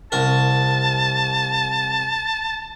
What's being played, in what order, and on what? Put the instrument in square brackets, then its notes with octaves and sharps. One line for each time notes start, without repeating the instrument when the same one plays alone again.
[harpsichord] C2 A#4 [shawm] A5